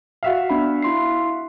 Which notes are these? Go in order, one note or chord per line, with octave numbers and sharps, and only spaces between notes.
F#4 E5 F5
B3 D4 B5
E4 C6 C7